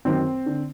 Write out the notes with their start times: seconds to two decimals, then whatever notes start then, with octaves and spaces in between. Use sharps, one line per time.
0.05 F#2 D#3 C4 C5
0.46 D3